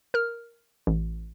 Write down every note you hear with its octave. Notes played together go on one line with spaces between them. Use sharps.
A#4 F6
A1